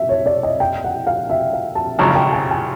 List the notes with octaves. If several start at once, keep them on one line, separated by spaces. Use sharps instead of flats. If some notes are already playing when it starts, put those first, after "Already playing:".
Already playing: E5
C#5
D5
D#5
G5
F#5
F5
E5
F5
A5
G#1 F#2 C#3 F3 G#5
G5
G#5
G#5